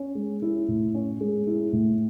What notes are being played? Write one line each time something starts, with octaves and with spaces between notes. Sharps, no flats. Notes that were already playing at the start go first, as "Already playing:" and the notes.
Already playing: C#4
G#3
E4
A2
C#4
G#3
E4
A2